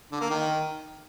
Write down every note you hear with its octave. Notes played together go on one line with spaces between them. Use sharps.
D3
A#3
D#3